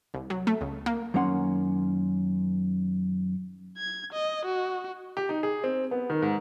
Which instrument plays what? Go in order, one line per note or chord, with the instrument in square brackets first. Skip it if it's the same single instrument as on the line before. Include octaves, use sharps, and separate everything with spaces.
[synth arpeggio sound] C2
F#3
A3
C#2
A#3
[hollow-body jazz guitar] F#2 D#3 A#3 C#4 F#5 C6
[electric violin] G#6
D#5
F#4
[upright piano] G4
D#4
G#4
C4
B3
D#3
G#2